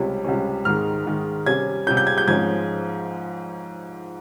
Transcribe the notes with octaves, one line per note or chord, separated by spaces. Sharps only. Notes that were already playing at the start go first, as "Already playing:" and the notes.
Already playing: C#2 C3 G3 C#4
C#2 C3 G3 C#4
G#2 D#3 G#3 F6
G#2 D#3 G#3
C3 G3 C#4 G#6
C3 G3 C#4 G6
G6
G#6
G6
G#2 F3 G#3 C#4 G#6